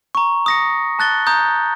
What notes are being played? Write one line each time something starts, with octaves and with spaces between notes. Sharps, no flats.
A#5 C#6
D#6 A#6 C#7
A5 F#6 A6 G7
A#5 D#6 G6